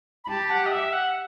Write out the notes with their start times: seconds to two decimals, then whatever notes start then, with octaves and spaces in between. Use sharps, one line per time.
0.24 B5
0.29 G4 A5
0.50 F#5
0.66 D#5
0.71 E5
0.93 F#5